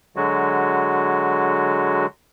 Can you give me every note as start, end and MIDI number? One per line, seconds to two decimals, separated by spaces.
0.16 2.06 50
0.16 2.06 54
0.16 2.06 56
0.16 2.06 66